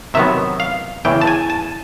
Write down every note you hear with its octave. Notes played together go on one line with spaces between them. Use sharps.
C3 D#3 F#3 B3 E5
F5
E2 C#3 E3 G5
A5
G#5
A5